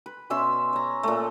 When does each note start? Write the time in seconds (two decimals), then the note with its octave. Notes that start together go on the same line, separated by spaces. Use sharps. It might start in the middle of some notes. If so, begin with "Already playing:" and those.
0.06 B4
0.30 B2 C#4 E5 C6
0.73 C#5 A#5
1.03 A#2 A3